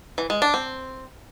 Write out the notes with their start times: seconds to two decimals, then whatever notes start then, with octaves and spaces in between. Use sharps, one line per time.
0.18 E3
0.30 G#3
0.42 D4
0.54 C4